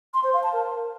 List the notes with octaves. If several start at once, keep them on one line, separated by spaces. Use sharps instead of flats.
C6
C5
F5
A5
A#4